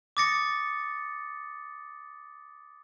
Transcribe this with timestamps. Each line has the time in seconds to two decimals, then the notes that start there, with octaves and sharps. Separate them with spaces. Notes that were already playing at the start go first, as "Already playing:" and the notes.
0.17 D6 D#6 A6 A#6 C#7